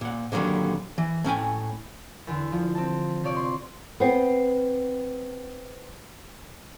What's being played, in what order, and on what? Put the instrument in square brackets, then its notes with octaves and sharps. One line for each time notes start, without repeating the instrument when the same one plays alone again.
[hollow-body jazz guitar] A#2 F#5
A#2 D3 D#3 F#3 G3
E3
A2 C#4 G5 G#5
[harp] E2 D3
F3
C4 A5
C3 F3 C#5 D5
C6
[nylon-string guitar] B3 C4